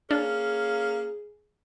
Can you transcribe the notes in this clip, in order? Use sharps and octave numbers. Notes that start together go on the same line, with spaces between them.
A#3 C#4 D4 G#4 F5